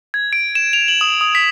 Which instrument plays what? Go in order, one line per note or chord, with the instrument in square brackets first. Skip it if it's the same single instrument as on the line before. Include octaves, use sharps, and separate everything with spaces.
[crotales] G#6
D7
E7
F7
F#7
D#6
D#6
B6